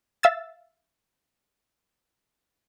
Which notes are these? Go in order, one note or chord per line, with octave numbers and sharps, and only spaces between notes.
E5 F5 E6 A6